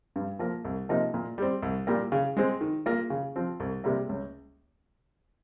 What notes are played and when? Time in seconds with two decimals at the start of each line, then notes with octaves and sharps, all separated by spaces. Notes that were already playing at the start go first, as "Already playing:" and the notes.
0.16 G2
0.39 F3 A#3
0.65 C2
0.89 C3 F3 A#3 D#4
1.14 A#2
1.38 G3 C4
1.63 C2
1.87 A#2 G3 A#3
2.12 C#3
2.37 G#3 C4
2.61 D#3
2.86 A#3 F4
3.10 C#3
3.36 F3 C4
3.60 C2
3.84 C3 G3 A#3
4.09 C#2